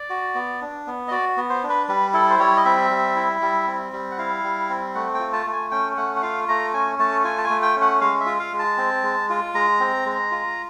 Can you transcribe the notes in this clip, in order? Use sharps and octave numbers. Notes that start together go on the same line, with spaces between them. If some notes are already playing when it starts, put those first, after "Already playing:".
Already playing: D5
F#4
B3
D4
B3
D#5
F#4 D5
B3
C5
D4
B4
G3 B4
E4 A4
C5
G3 C#5
D#5
C4 E5
G3
E4
G3
C4
G3
F#5
E4 F5
G3
C4
A3 F#5
G5
F4
A5
A3
G#5
C#4 G5
A3 F#5
F#5
F4 F5
A3 A#5
C#4 G#5
A3 A5
F4 G#5
A5
G#5
A3
G5
C#4
F#5
G#3 F5
E5
F4
F5
G#3
A5
C4
G#3
F4
G#3 A#5
C4
G#3
F4